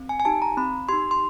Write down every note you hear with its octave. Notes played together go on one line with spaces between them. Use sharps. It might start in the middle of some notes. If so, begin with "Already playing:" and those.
Already playing: C4
G#5
G#5
D#4 G4 A5
A#5
C4 B5
D#4 G4 C6
C6